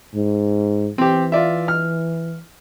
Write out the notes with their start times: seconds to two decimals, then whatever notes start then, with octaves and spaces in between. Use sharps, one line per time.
0.14 G#2
0.98 E3 C4 G4
1.32 F4 D5 E5
1.68 F6